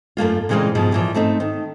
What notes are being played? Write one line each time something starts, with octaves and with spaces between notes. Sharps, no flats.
F#2 A3 A#3 F4
A#2 C#3 E3 G#3 A#3 C4
G#2 B2 F3 G#3
A#2 E3 F3
G#2 A3 C4 D#4
D#3